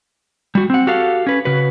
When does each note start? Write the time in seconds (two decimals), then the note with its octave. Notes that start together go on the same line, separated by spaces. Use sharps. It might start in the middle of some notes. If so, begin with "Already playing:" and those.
0.55 G3 F#4
0.70 C4 F#5
0.87 F#4 G4 A4 F5
1.27 C#4 B4
1.45 C#3 F#4 B4